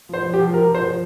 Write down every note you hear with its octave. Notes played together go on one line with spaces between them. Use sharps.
F3 C5
F3
G4
F3
F3 A#4
F3
C5
F3